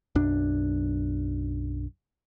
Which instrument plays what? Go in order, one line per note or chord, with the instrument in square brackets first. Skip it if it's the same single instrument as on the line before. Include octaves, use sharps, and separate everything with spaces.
[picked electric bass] B1 F#2 D4